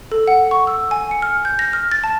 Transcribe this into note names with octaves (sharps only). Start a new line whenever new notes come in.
A4
F#5
C#6
E6
G#5
C#7
F6
G6
A#6
F6
A6
A5